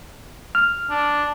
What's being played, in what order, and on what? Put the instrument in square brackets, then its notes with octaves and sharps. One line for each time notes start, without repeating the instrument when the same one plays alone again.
[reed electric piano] F6
[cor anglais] D4